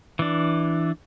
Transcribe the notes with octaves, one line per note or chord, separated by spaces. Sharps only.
E3 D4